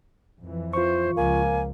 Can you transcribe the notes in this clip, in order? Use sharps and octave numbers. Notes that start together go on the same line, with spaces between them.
F2 E3
F4 C5 C#6
C#2 F3 A#3 G#5